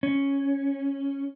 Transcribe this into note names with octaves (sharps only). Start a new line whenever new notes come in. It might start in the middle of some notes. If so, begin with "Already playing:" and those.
C#4